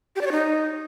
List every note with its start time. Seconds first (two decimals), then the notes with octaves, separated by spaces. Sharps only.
0.16 G4
0.21 D5
0.26 C#5
0.32 D#4